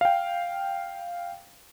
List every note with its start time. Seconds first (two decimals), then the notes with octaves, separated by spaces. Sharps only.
0.01 F5 G5